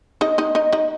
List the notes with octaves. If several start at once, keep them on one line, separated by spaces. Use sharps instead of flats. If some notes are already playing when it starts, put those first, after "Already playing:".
D#4 D#5
D#4 D#5
D#4 D#5
D#4 D#5